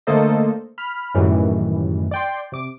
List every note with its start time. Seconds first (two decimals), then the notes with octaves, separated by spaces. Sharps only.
0.07 D3 A3 A#3 A4 C5 D#5
0.78 B5 F6
1.15 F#2 A2 D#3 E3 G3
2.11 D5 G5 C6
2.52 C3 D6